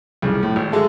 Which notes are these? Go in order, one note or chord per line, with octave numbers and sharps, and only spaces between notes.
C2 F2 C#3
A2
G#1
D3 G#3 A3 A4